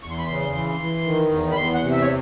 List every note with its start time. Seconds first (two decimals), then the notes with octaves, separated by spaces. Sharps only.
0.03 E2 C#6
0.11 C6
0.18 B5
0.26 C#3 C6
0.54 E3
0.81 E3
1.06 D#3
1.32 E2
1.52 B5
1.57 E2 C6
1.74 F#5
1.82 C3
1.91 E5
2.02 C#5